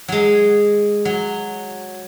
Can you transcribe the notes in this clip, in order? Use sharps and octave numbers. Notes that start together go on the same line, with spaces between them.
F#3 G#3
F#3